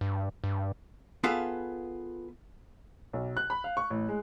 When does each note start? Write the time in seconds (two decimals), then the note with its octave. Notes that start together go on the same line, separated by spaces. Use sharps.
0.01 G2
0.44 G2
1.24 B3 F4 G#4 A4 B4 F5
3.13 B1
3.37 F#6
3.50 B5
3.64 F5
3.77 C#6
3.90 A1
4.09 G#3